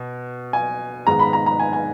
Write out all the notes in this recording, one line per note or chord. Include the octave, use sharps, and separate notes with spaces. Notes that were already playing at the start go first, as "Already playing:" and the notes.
Already playing: B2
G#5
G#2 D#3 G#3 B3 A#5
B5
A#5
A#5
G#5
G#5